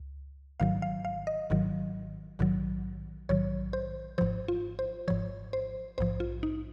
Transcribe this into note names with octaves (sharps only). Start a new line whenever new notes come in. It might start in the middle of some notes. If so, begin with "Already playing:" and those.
Already playing: C#2
G#1 G#2 D#3 F#3 F5
F5
F5
D#5
G#1 G#2 D#3 F#3
A#1 G#2 D#3 F#3
A#1 G#2 D#3 F#3 C#5
C5
G#1 G#2 F3 C5
F4
C5
G#1 G#2 F3 C#5
C5
A#1 G#2 F3 C5
F4
D#4